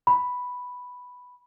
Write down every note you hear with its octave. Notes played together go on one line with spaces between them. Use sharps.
B5